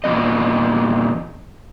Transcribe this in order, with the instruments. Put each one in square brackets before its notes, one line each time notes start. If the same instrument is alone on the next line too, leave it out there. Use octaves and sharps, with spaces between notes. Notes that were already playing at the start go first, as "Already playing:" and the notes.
[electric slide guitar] E2 A#2 G#3 C4 D#5